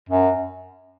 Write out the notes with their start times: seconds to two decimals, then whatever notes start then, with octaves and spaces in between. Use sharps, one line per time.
0.09 F#2